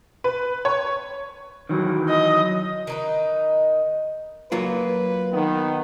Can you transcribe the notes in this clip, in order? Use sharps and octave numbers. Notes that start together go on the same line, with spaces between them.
B4
C#5
D#3 E3 F#3
D#5
D#3 D#4 B4
F#3 A#3 F4 B4
D#3 B3